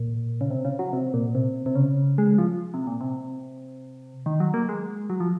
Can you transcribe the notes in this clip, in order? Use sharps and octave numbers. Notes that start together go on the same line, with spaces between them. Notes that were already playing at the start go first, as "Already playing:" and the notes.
Already playing: A#2
C#3
C3
C#3
F#3
C3
A#2
C3
C3
C#3
G#3
F3
C3
A#2
C3
D#3
F#3
A#3
G#3
F#3
F3